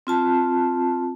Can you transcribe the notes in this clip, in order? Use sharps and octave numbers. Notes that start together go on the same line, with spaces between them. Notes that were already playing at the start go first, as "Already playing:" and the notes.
C4 F4 A5